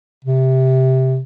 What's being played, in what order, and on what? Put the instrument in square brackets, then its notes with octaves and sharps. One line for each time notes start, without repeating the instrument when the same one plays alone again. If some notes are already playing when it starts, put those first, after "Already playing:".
[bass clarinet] C3